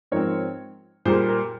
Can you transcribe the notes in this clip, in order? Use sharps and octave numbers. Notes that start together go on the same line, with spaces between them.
G#2 F3 C4 A#4 C#5
A#2 G3 A#3 G#4 C5
A#4